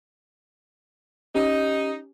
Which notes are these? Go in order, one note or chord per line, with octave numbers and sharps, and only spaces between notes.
C#4 D#4 G4